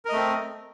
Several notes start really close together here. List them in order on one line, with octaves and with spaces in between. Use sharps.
A#4 D#5 A3 C4